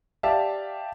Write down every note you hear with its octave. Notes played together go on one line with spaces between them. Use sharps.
G4 D5 E5 F5 A5